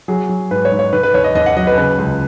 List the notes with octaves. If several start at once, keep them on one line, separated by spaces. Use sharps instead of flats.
F#3 G#4
F#3
G#2 B4
C#5
G#2
C#5
D#3 B4
B4
D#2 C#5
D#5
D#2 D#5
F#5
F#3 D#5
B4
C#3 B4
C#2